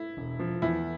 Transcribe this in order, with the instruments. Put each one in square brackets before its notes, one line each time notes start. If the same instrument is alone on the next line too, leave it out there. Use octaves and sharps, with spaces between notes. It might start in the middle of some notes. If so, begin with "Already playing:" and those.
Already playing: [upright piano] E4
[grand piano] E1
F3
[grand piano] E2 [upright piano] E4